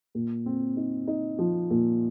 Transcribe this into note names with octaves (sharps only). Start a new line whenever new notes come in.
A#2
C4
D#4
D#4
F3
A#2